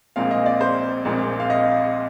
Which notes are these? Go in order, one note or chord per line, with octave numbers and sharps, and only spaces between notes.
A#1 A#2 G#3 C4 F5
D#5
D5
C5
A#1 A#2 G#3 C4
F5
D#5